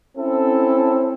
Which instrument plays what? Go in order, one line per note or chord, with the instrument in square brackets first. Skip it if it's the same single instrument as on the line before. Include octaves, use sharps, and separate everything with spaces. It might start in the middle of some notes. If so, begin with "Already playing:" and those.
[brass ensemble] C4 C#4 E4 A4